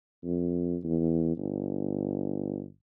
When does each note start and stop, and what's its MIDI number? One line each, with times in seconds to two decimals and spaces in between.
0.24 0.76 41
0.84 1.32 40
1.37 2.65 31